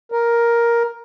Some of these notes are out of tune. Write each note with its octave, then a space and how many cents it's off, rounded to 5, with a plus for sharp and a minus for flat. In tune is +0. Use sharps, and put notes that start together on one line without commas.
A#4 +10